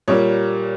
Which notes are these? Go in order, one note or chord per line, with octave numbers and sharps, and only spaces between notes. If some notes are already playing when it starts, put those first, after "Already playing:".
A#2 G3 A#3 C#5